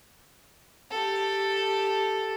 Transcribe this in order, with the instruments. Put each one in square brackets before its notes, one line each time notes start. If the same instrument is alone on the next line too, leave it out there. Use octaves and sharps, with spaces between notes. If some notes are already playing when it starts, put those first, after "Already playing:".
[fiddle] G4 A4